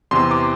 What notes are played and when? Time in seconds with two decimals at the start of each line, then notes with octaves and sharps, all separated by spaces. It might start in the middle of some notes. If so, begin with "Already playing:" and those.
0.11 E2 C3 E3 C6
0.31 D6